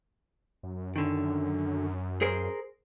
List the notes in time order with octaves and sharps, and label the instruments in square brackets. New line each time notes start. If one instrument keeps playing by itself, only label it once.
[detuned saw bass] F#2
[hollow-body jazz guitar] D3 D#3
G#4 A#4 C5